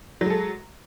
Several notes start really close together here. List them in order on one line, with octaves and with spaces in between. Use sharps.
F#3 G#3 A4